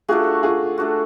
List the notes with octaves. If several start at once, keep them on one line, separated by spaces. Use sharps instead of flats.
A3 D4 F4 F#4 G#4
F4 G#4
A3 D4 F#4